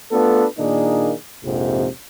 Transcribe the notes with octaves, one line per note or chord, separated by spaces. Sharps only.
A3 B3 D4 F4 A4 B4
A#2 D#3 A#3 D4 D#4 G#4
A#1 F2 G#2 C3